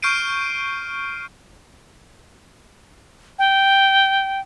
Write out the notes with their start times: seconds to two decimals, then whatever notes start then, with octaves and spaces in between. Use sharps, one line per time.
0.02 C#6 F6 G6 C7 D7 D#7
3.39 G5